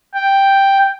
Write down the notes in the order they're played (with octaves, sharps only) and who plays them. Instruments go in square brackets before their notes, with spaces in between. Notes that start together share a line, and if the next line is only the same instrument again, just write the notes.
[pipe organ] G5